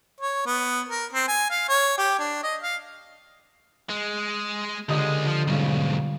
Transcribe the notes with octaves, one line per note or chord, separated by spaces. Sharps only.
C#5
B3
A#4
C4
G#5
F5
C#5
G4
D4
D#5
F5
G#3
C#2 D3 G#3 G4 D#5
F3
B1 G#2 G3 C#4 F4